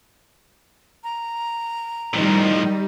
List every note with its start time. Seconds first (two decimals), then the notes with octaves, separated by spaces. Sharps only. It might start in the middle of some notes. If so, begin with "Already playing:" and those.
1.04 A#5
2.14 A2 D#3 F3 G3 D#4